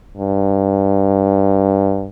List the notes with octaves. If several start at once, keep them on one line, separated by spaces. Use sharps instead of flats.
G2